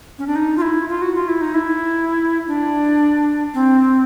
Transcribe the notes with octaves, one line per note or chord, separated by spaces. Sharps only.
C#4
D4
D#4
F4
E4
F4
F#4
F4
E4
D#4
E4
D4
C4